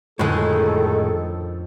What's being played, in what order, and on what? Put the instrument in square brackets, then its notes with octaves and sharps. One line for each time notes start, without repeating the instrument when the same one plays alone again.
[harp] F2 D3 F#6 [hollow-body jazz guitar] A2 G#3 [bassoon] D#3 [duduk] A4